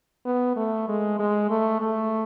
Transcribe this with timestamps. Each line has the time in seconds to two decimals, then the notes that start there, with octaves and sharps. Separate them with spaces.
0.25 B3
0.56 A3
0.88 G#3
1.19 G#3
1.50 A3
1.80 A3